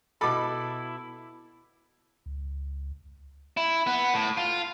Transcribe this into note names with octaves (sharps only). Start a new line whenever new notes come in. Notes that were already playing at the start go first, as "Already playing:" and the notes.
B2 E4 A4 B5 D6
C#2
E4
B3
A2
F4